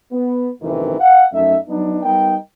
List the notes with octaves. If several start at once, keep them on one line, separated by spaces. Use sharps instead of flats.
B3
F#1 D2 A2 C3 D#3 E3
F5 F#5
F#2 A3 D#4 E5
F#3 B3 D4 D#4
G3 B3 D#4 A#4 G5